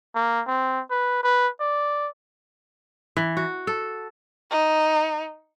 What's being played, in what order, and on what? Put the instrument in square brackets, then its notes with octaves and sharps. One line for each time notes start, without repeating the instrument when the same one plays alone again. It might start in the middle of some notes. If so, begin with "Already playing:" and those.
[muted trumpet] A#3
C4
B4
B4
D5
[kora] E3
F#4
A4
[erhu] D#4